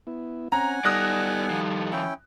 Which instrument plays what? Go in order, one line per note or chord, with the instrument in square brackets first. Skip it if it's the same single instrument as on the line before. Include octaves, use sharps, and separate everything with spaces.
[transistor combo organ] B3 E4
[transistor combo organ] C4 C#4 [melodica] F#5 G#5 [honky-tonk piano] A#5
[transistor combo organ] G3 D#4 A4 [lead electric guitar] B3 D5 [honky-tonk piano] D#6 F#6 A#6
[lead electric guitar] D#3 F3
[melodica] C#4 E4 G5